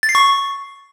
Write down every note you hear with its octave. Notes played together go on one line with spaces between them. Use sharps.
A6
C7
C#6